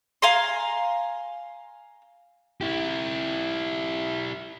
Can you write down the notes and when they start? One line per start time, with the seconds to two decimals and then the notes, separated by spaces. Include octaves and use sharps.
0.22 F5 G#5 A#5 C6
2.61 E4 G4